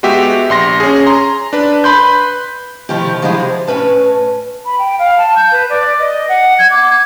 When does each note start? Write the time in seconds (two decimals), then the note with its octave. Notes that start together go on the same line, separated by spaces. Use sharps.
0.03 G#3 B3 F#4 G4 E5
0.50 A#1 C6 A#6
0.80 C#4 G#4
1.07 A#5 C6
1.53 D4 B4
1.84 B4 B5 C6 G6
2.89 C3 D#3 F3 A3 E4 G4
3.22 F3 F#3 G#3 E4 G4 G#4
3.40 F3
3.67 A2 C#4 B4 A5
4.65 B5
4.78 G5
4.99 F5
5.18 A5
5.36 G6
5.51 B4
5.70 D5
6.00 D#5
6.29 F#5
6.59 G#6
6.71 D6
6.89 G#6